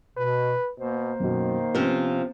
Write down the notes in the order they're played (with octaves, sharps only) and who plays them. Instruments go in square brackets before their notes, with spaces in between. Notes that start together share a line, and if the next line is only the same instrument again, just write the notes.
[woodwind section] B2 [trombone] B4
[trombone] B2 [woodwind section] A#3 C5
[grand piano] F#2 B2 [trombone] D#3
[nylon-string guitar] C3 F3 [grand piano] B3 C#4